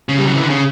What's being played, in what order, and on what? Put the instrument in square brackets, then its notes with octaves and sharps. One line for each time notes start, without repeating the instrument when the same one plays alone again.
[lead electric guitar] C#3
G3
F#3
E3
D3
C#3